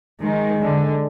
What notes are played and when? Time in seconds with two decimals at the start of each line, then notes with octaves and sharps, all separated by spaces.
0.22 D#3 G#3
0.62 D3